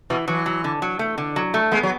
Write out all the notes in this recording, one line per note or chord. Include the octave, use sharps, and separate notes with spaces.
B2 E3
E3 F#3
F#3
D3
F#3
A3
D3
F#3
A3
G#3 B3
F#3